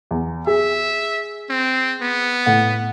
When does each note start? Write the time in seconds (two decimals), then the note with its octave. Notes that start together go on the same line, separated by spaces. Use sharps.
0.11 E2
0.47 G#4 E5
1.50 C4
2.01 B3
2.46 A2 F#5